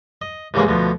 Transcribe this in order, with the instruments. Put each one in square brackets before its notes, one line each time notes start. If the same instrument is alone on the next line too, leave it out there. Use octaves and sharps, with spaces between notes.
[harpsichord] D#5
C2 G#2 C#3 E3 A#3 G#4
D2 B2 F3